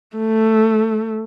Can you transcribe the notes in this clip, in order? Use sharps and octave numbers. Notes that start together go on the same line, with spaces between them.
A3